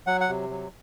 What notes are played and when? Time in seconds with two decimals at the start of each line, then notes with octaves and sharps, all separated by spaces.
0.07 F#3 F#5
0.21 F#5
0.29 C3
0.50 F#3